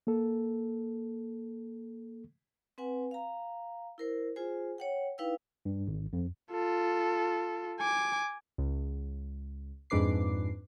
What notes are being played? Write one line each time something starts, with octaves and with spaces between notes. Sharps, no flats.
A#3 A4
C4 B4 F#5 G#5
F5 A#5
E4 A#4 C5
F4 G#4 C5 G#5
C#5 F#5 G5
D#4 E4 B4 F5 G5 E6
G2
G#1
F2
F4 A4
G#5 D6
C#2
F2 G#2 D4 B4 D6 C7